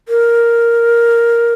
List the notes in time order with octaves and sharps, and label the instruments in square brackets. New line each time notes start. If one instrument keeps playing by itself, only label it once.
[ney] A#4